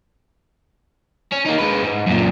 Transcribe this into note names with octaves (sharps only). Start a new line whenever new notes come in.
C#4
A#3 D#4
G#3 B4
G#2
F#2 A#2